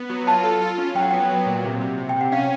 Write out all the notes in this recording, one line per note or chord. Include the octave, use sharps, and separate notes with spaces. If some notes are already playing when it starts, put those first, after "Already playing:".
Already playing: B3
F#3
F4 A5
A4
F4
C#4
F#3 G5
F#5
B3 G5
F#3
A#2
C3
C3
C3
G5
C3
F#5
C#4 F5